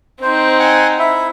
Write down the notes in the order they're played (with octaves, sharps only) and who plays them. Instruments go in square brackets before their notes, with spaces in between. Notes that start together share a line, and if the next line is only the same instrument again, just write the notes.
[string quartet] C4 D#4 [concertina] C5
[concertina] F#5 G#5
E4 E5